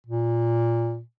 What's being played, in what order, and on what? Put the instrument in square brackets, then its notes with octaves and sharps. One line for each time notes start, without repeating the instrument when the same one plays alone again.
[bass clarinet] A#2